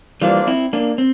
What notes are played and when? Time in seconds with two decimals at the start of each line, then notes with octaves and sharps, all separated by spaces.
0.22 E3 F3 G3 A#3 D4 F4
0.47 C4 E4
0.73 A#3 D4
0.98 C4